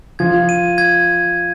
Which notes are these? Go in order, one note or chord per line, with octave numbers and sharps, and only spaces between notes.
F3 G#6
D#7
G#6